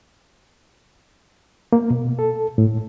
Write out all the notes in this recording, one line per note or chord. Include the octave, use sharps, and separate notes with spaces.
A#3
B2
A4
A2